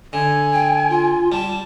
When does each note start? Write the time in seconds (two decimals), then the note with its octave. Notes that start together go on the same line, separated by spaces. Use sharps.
0.13 D3 G#5
0.53 G5
0.90 F4
1.32 G3 A5